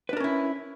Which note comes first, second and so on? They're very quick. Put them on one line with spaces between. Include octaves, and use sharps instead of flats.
B4 D4 A#4 C#4 E4